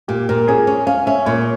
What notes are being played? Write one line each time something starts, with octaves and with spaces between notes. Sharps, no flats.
A#2 G4
A#2 A#4
C#4 G#4
C#4
C#4 F5
C#4 E5
A#2 C#5